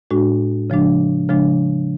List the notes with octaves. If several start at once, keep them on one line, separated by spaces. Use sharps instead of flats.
A2 G#3 D4 F#4
C#3 F3 G#3 D4
C#3 F3 G#3 D4